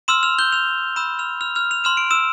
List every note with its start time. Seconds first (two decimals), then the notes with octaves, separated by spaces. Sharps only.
0.08 C6 E6 F6 E7
0.23 F6 F7
0.39 G6 G7
0.52 F6 F7
0.96 B5 E6 G6 E7
1.19 F6 F7
1.41 F6 F7
1.55 F6 F7
1.71 F7
1.84 C6 F6 E7
1.97 D7
2.11 E6 E7